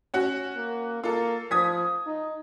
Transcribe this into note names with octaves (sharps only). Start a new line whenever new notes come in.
C#4 F#4
A#3
A#3 F4 A4
F3 D#6 G#6 B6
D#4